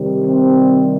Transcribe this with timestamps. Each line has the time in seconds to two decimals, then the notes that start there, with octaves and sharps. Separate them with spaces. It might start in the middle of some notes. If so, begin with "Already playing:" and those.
Already playing: C3 D#3 G3
0.26 C4